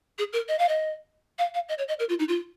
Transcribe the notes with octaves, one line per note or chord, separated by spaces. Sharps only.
G#4
A#4
D#5
F5
D#5
F5
F5
D#5
C#5
D#5
A#4
F4
D#4
F4